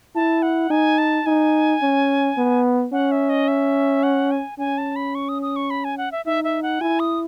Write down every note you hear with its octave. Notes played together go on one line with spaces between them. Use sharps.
E4 A5
F#5
D#4 G#5
A5
D#4 G#5
C#4
B3
C#4 F#5
E5
D#5
E5
F#5
G#5
C#4 G#5
A5
B5
C#6
D#6
D#6
C#6
B5
G#5
F#5
E5
D#4 E5
E5
F#5
E4 G#5
D#6